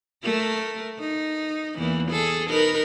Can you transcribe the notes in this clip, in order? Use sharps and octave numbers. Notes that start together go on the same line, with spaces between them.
A3 A#4
D#4
E2 E3 A#3
G#4 A4
D#4 A#4 B4